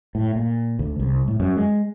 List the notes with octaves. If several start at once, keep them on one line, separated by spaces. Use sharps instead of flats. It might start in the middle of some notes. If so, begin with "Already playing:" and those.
A2
A#2
D2
C2
A2
F#2
G#3